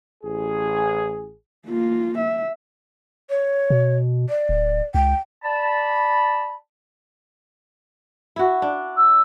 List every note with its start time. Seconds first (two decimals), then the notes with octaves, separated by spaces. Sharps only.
0.24 A1 G#4
1.68 A#3 F4
2.18 E5
3.30 C#5
3.70 B2
4.29 D5
4.49 D1
4.94 C#2 G5
5.44 D5 A5 B5
8.36 E4 F#4
8.62 D4
8.96 E6